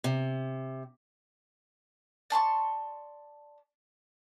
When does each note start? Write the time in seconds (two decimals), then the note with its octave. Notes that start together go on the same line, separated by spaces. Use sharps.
0.04 C3
2.30 D5 A5 C6 C#6